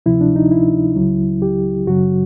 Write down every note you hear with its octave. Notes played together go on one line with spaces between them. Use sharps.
D2 C3 F3 E4
D4
D#4
E4
C#2 C#3 F#3
G4
F#2 C#3 F#3 F#4